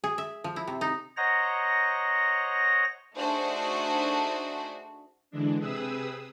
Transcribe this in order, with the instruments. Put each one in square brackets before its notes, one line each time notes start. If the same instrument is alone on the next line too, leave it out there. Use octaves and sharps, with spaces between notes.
[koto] G#4
E5
F3
E4
C3
D#4
[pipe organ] C5 C#5 D#5 F#5 A#5 A#6
[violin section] A3 D4 D#4 F#4 G#4 C5
[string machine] D3 E3 G#3 D4
C3 C4 G#4 B4 D#6 E6